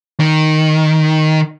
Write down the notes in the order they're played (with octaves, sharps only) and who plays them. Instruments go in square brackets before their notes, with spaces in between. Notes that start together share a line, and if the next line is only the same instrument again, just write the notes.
[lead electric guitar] D#3